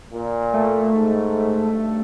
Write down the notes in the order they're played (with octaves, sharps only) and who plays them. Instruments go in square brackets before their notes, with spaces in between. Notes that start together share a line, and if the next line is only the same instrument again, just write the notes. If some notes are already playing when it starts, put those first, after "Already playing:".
[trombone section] A#2
[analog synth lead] A3
[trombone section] G#2
G2